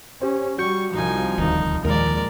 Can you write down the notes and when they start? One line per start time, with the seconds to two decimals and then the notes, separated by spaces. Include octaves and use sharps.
0.22 C#4 G4 C5
0.58 G3 F#4 C#6 G6 C#7
0.93 C2 F3 D#4 G#5
1.38 D#1 D2 D#3 D#4
1.84 D#2 A#2 D#3 F3 G#3 A#4 D5